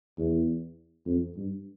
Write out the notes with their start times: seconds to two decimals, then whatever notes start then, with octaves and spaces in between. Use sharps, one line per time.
0.17 E2
1.06 F2
1.36 G2